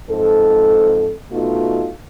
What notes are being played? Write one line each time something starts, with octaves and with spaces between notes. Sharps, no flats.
F2 G#2 A4
B2 A3 D#4 F4 F#4